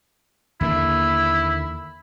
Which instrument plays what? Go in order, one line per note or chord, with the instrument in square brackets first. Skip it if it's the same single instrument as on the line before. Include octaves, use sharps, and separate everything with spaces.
[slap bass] D#2 D3 A#3 [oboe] E4